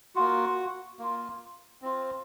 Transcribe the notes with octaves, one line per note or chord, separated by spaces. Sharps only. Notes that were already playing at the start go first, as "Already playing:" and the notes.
A#3 F4 F#4
A#3 F4
C4 F4